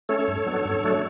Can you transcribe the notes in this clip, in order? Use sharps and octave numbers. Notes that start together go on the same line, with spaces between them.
A3 C#4 A4 C#5
G2
F#3 B3 D4
G2
F#3 A3 D4
C#5